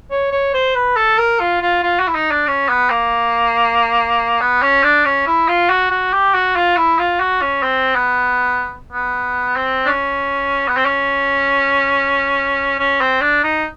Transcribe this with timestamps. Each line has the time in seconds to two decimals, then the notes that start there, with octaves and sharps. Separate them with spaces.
0.11 C#5
0.32 C#5
0.54 C5
0.75 B4
0.96 A4
1.18 A#4
1.40 F4
1.62 F4
1.83 F4
2.00 F#4
2.08 E4
2.15 D#4
2.31 D4
2.47 C#4
2.69 B3
2.90 A#3
4.41 B3
4.62 C#4
4.84 D4
5.05 C#4
5.27 E4
5.48 F4
5.70 F#4
5.91 F#4
6.13 G4
6.34 F#4
6.56 F4
6.77 E4
6.99 F4
7.20 F#4
7.41 C#4
7.63 C4
7.95 B3
8.93 B3
9.56 C4
9.85 D4
9.88 C#4
10.68 B3
10.77 C4
10.86 C#4
12.79 C#4
13.01 C4
13.21 D4
13.44 D#4